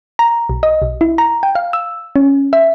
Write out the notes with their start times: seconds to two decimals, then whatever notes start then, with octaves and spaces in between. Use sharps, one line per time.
0.19 A#5
0.49 B1
0.63 D#5
0.82 B1
1.01 E4
1.18 A#5
1.43 G5
1.55 F5
1.73 E6
2.16 C#4
2.53 E5